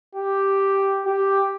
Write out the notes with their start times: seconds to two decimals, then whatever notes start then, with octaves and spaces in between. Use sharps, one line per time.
0.15 G4
1.06 G4